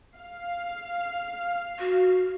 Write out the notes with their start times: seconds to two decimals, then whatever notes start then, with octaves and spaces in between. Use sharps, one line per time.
0.19 F5
1.79 F#4